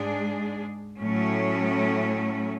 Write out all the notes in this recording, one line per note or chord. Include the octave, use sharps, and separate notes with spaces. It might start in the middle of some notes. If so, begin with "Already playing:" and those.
Already playing: G#2 G#3 D4 G#4
A2 F#3 A3 C#4